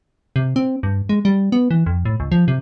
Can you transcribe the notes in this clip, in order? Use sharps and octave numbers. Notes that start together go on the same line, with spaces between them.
C3
C4
G2
G#3
G3
B3
E3
F2
A2
C#2
F3
C3